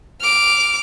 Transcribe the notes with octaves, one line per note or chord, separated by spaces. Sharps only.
D6 F6